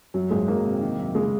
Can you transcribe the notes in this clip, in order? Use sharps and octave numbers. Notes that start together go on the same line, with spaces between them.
F#2 F#3
G#1 G#3
D#3 A#3
C3
D#3
F#2
C#3 G#3